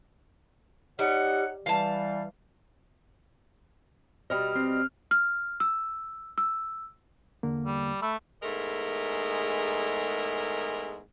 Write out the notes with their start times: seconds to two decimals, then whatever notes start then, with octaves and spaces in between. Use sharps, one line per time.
0.99 G3 D#4 C#5 F#5
1.66 E3 G3 F5 A5
4.30 B2 G3 D#5 F6
4.55 C4
5.11 F6
5.60 E6
6.38 E6
7.43 E2 D3 A#3
7.66 G3
8.02 A3 B5 E6
8.42 E2 G#2 G#3 A3 A#4